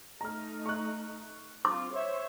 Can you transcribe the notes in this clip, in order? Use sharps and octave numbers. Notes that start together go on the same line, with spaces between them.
A3 D#4 A#5 F6
C#6 F#6
C4 F4 D6
C5 C#5 E5